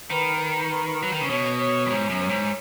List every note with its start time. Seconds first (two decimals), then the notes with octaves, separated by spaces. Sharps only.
0.10 D#3 B4
0.39 B4
1.03 F#3
1.12 D#3
1.21 C#3
1.29 B2 C#5
1.60 C#5
1.86 F#2
1.90 G#2 C#5
2.10 F#2
2.20 C#5
2.29 G#2